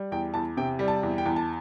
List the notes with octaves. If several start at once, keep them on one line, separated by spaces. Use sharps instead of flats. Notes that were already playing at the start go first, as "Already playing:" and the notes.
Already playing: G3
E2 G5
E2 A5
C3 G5
G3
A5
E2
G5
E2
A5